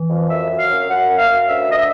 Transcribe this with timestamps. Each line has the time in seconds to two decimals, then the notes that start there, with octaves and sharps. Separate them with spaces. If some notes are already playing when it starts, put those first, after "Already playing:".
Already playing: E3
0.09 F2
0.29 F#2 E5
0.49 F#2
0.58 F5
0.69 F#2
0.89 F#2 F#5
1.09 F#2
1.18 F5
1.27 F#2
1.48 D2 E5
1.68 D2 D#5
1.77 E5